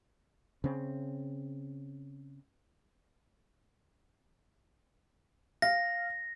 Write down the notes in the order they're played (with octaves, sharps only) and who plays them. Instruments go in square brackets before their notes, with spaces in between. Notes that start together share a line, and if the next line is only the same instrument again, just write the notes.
[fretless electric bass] C#3 C4
[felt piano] F5 [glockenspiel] A#6